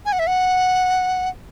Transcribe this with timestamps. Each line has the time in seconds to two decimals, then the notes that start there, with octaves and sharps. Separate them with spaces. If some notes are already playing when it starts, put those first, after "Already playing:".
0.06 G#5
0.13 F#5
0.19 E5
0.27 F#5